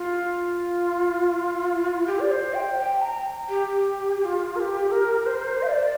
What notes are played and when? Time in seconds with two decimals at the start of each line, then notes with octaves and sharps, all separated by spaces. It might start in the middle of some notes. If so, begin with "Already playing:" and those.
Already playing: F4
2.07 G4
2.20 D5
2.31 C5
2.54 G5
2.78 G5
3.01 A#5
3.49 G4
4.20 G4
4.25 F4
4.55 A#4
4.60 G4
4.91 A#4
5.26 C5
5.62 F5
5.67 D5